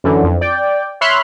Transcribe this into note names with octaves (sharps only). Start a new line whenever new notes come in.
F#2 D3 E3
F2
D5 G5
C#5 E5 B5 C6 F6 F#6